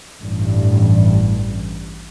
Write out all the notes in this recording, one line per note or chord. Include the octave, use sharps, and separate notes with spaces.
A1 G2